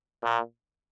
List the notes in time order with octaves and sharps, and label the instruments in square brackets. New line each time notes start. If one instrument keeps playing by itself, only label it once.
[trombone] A#2